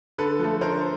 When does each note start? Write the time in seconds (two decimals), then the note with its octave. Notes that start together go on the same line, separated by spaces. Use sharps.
0.18 D3 A4 B4
0.39 F3 A3
0.61 D3 A#4 C5